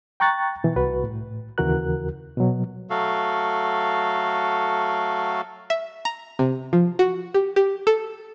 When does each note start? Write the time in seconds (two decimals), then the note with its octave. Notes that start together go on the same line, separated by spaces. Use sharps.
0.20 G5 A#5 C#6 F#6 A6
0.64 B2 E3
0.76 C2 F#4 B4
1.04 A2
1.58 D#2 C#3 E3 F#4 A#4 F#6
2.37 B2 F#3
2.90 F#3 A3 F#4 A4 F5
5.70 E5
6.05 A#5
6.39 C3
6.73 F3
6.99 F#4
7.34 G4
7.56 G4
7.87 A4